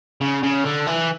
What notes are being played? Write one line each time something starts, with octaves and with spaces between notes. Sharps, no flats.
C#3
C#3
D3
E3